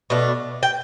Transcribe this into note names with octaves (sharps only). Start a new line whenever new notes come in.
B2 A3 D4
G5